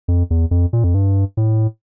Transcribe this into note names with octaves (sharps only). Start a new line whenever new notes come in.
F2
E2
F2
A#2
F2
G2
A2